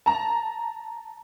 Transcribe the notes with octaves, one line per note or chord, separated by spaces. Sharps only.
A5 A#5